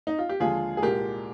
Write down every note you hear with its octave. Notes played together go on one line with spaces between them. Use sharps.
D#4
F4
G4
D#2 D3 F3 G#3 F4 G#4
G#4
C2 A#2 G#3 G4 A#4